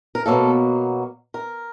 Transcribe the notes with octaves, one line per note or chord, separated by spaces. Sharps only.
A#4
B2 F#3 A#3 A4
A#4